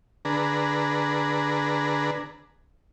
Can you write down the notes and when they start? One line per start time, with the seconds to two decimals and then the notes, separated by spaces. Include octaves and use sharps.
0.25 D3 D4 G#4 B4 A#5